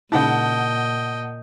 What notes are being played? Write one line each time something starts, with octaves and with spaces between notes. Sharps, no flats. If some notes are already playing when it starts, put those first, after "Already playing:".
A#2 C#3 D#4 E4 D#5 F#5 G5 A5